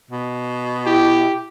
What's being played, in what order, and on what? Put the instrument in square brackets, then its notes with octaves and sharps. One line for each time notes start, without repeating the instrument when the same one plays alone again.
[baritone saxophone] B2
[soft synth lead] E4 [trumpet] G4